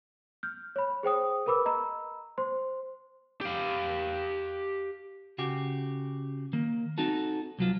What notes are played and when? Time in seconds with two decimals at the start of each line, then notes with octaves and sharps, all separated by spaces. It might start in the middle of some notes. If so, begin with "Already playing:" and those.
0.43 F6 G6
0.76 C#5 B5
1.03 G#4 C5 G5 D#6
1.46 A#4 B4 B5 D6 E6
1.66 D#5 A#5 B5 E6
2.38 C5 C6
3.41 G4 F5
5.38 C#3 F#4 G4
6.53 D#3 A#3
6.98 C4 D#4 F#4 A4
7.59 C2 F#3 F4